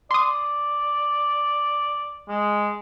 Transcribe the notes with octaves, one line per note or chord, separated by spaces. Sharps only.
D5 C6 D#6
G#3